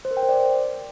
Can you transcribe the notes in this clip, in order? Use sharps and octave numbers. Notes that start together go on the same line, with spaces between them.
C5
A#4
G5
C5
D5